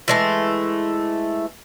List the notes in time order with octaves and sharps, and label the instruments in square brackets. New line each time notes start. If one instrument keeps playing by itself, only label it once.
[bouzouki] E3 G#3 A3